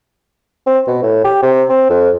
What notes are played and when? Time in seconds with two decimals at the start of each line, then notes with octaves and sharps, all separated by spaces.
0.67 C4
0.87 B2
1.03 A2
1.24 G4
1.43 C3
1.69 C4
1.90 F2